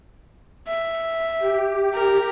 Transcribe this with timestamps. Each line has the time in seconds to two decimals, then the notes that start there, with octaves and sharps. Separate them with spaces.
0.68 E5
1.39 G4
1.94 A#4